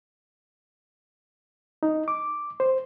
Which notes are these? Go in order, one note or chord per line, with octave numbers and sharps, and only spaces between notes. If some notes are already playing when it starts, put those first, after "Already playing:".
D#4
D6
C5